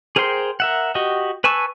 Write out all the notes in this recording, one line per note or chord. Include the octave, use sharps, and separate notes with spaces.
G#4 A#4 C5 G5 C6
A#4 E5 F#5
F#4 G4 D#5
B4 G#5 A5 C#6 E6